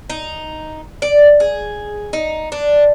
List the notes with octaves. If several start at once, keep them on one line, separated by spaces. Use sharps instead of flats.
D#4
D5
G#4
D#4
D4